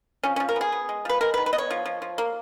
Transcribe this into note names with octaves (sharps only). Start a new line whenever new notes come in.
F3 C#4
C#4
F3
A#4
B3 G#4
B3
G#3
F3 B4
G#3 A#4
B4
D#3
B4
B3 D#5
C#5
F3
F3
F3
A#3